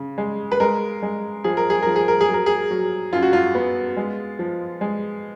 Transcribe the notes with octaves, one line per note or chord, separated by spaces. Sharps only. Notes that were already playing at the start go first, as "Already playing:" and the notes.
Already playing: C#3
G#3
B4
G#3 A#4
G#3
F3 G#4
A#4
G#4
F3 A#4
G#4
A#4
G#4
F#3
A#4
G#4
F#3
F#2 F4
F#4
F4
B3
G#3
F3
G#3